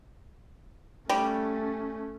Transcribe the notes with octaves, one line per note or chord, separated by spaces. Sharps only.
G3 A3 C#4